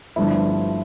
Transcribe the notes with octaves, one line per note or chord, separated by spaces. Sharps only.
G1 G2 F3 A3 E4